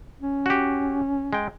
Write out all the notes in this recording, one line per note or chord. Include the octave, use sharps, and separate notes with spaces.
C#4
F#4 G4
G#3 G5